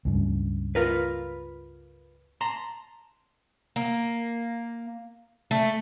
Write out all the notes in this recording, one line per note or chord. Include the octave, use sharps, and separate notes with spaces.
C#2 G2 C#3
F4 A#4 B4
A5 A#5 C6
A#3
A3